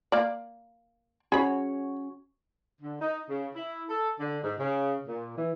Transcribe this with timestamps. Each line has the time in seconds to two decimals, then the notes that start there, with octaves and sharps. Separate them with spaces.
0.12 A#3 D5
1.32 C#4 F#4 G#4 C#5 B5
2.81 D3
3.00 D#4
3.29 C#3
3.54 E4
3.89 A4
4.19 D3
4.44 G#2
4.59 C#3
5.07 A#2
5.37 E3